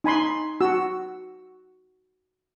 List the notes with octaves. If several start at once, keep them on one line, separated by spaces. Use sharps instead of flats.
D#4 G#5 B5 C6
F#4 E6